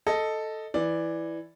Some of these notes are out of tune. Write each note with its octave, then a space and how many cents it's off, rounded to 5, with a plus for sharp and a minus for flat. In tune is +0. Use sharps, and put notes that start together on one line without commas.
A4 +0 D#5 +0
E3 +0 D5 +0